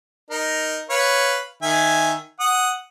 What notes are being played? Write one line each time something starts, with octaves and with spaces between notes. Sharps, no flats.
D#4 A#4
B4 C#5 F5
D#3 E5 G#5
F#5 D#6